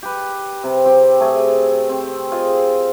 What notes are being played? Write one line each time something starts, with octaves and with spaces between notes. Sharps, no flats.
G4 B4
C3 C4
C4 G4
A3 G#4
C4
F4 G#4 C5 D#5